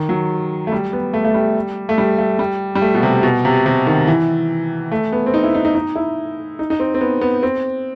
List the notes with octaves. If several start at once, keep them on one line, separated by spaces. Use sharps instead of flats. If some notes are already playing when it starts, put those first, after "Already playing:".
Already playing: D#3
F#3
A3
G3
B3
A3
A3
G3
A3
G3
A3
G3
G3
A3
B2
C3
B2
C3
C3
D#3
E3
A3
B3
C4
D#4
E4
D#4
D#4
D#4
E4
D#4
D#4
C4
C4
B3
B3
C4